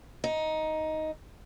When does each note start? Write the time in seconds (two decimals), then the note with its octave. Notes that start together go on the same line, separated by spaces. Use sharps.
0.24 D#4